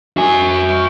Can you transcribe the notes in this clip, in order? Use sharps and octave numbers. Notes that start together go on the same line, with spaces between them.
F#4 G#5